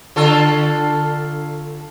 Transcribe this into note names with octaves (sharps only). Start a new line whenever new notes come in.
D3 F4 A4